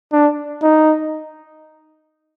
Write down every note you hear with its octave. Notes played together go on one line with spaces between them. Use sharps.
D4
D#4